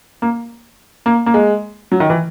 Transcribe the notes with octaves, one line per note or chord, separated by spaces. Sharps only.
A#3
A#3
A#3
G#3
F#3
D#3
E3